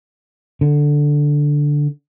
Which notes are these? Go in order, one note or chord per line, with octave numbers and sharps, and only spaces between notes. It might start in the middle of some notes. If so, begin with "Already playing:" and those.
D3